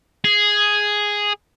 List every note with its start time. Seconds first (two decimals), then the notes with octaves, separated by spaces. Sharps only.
0.24 G#4